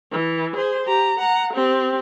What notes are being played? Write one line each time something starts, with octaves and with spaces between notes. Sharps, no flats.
E3
G#4 C5
G4 A#5
F#5 A#5
C4 G4